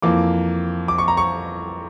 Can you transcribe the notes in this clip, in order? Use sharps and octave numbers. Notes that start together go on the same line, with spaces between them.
F2 E3 A#3 D6
D6
C#6
A#5
C#6